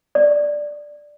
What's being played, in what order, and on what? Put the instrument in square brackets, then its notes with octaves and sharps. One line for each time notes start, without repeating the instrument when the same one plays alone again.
[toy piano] D5